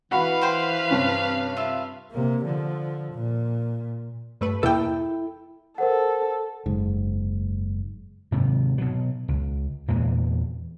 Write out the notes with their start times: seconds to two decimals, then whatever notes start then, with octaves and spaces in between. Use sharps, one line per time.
0.11 E3 F#4 B4 F5 F#5 B5
0.41 C5 G5 C6
0.91 G2 C3 C#4
1.57 F4 E5
2.11 C3 A#3
2.44 D3 F3
3.13 A#2
4.41 G2 A3 B4
4.63 E2 B2 A#3 E4 A4 G5
5.78 A4 A#4 C5 F#5
6.66 F#1 G#2
8.32 G#2 C3 D#3 F#3
8.78 B2 F#3
9.28 C#2
9.88 E2 A#2 E3 G#3